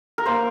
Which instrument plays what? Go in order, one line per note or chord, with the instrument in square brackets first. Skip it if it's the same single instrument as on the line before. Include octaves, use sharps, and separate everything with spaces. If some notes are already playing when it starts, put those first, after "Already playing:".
[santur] A#4
A#3 C5